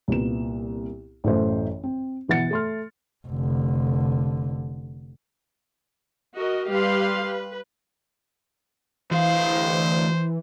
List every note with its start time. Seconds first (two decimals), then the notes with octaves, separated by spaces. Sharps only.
0.08 C2 A#2 B3 E7
1.24 A1 F#2 A2 E3 A3 C5
1.83 C4
2.28 B2 E3 F#5 A6 C#7
2.51 A3 C6 F6
3.28 F1 D3
6.36 F#4 A#4 D#5
6.69 G3 G4 B4 F5 C6
7.24 B4
9.11 D2 E3 C5 F5